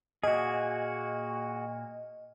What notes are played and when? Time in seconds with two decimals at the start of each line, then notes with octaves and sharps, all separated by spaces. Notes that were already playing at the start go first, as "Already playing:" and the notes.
0.24 A#2 A#3 F#4 G#4 D#5